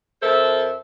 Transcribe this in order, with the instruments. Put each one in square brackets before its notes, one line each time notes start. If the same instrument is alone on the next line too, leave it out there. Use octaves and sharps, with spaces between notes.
[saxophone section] F2 A4 A#4 C5 E5